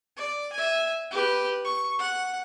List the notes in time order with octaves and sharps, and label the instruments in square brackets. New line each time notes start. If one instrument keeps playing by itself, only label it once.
[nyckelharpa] D5
E5 G#5
G4 B4
C#6
F#5